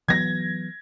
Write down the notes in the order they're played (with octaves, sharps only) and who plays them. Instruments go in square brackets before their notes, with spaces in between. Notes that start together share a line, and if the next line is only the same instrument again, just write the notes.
[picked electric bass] E3 F#3 B3 [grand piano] G#6 A#6